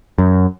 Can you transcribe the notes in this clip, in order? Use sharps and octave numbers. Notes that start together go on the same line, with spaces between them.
F#2